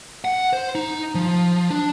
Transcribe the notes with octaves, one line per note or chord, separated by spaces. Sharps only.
F#5
C5
D#4
F3
D4